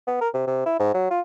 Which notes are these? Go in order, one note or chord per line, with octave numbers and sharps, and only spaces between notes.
B3
A#4
C3
C3
E4
G#2
F#3
F4